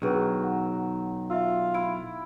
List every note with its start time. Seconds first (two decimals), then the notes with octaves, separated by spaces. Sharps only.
0.02 B1 D#3 F#3 D4 G#4 B4
0.44 F#5
1.30 F4 E5 E6
1.74 E4 D7